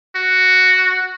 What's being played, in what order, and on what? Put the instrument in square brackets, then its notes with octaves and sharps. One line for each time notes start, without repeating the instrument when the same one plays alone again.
[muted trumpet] F#4